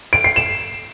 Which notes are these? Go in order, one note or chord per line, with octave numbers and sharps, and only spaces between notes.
D7
C7
E7